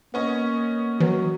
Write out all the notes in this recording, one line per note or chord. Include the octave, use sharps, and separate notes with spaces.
A#3 B3 C#4 D#5
D#3 E3 F#3